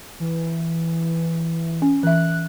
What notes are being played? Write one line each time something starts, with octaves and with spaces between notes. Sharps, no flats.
E3
C#4
E3 E5 F#6